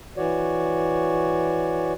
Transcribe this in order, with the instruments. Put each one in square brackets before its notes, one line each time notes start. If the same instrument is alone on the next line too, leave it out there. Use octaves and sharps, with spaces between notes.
[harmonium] E3 F#4 C#5 D5